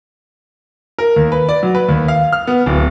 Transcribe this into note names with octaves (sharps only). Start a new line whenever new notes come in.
A#4
D#2
B4
D5
F#3
B4
D#2
F5
F6
B3
D1